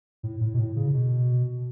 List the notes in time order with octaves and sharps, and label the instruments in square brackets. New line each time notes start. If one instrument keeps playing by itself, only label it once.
[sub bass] A2
A2
B2
A2
C#3
B2